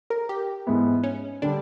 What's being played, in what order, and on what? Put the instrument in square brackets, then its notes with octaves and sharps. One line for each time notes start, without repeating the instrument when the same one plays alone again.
[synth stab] A#4
G4
[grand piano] G#2 E3 G#3 B3 E4
[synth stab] C#4
[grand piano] D3 G3 [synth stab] D4